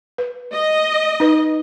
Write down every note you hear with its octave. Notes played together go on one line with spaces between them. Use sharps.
B4
D#5
D#4 B4